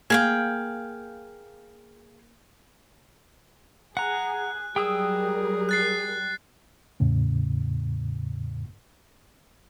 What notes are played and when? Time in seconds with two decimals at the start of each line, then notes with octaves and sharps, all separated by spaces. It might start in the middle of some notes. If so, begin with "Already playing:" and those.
0.10 A#3 G#4 F5 G5
3.97 G#4 F#5 A#5 F#6
4.76 F#3 G3 G#4 A#4 G5 D#6 E6
5.69 F#6 A6 C7
7.00 E2 A2 C#3